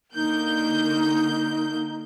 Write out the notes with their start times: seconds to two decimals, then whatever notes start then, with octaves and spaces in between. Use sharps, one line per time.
0.15 D3 A#3 D#4 G6